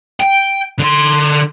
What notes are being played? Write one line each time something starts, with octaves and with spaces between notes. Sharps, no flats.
G5
D3 C6